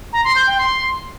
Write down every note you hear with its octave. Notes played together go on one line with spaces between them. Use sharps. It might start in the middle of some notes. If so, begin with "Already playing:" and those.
A#5
C6
G6
G5
C6